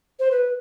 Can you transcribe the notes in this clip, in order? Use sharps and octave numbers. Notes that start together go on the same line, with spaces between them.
C5
B4